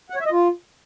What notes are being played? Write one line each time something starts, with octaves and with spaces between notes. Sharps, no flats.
F#5
C#5
E5
D#5
F4